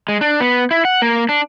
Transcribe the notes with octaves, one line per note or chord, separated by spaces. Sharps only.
G#3
D4
B3
E4
F#5
A#3
D4